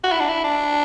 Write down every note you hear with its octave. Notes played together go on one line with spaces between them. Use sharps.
F#4
E4
D4
E4
D4